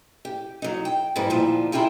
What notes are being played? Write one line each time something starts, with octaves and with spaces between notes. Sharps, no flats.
G4
F#3 D#4
G5
G#2 E3 G3
D2 A#2 F3 D4 D#4
E4 F4 G4 G#4 A#4